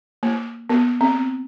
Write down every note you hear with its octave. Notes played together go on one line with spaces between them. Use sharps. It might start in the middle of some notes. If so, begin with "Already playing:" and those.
A#3
B3
C4